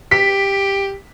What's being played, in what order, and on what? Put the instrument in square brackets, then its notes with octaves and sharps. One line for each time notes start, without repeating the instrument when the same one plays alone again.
[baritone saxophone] G4 [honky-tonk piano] B6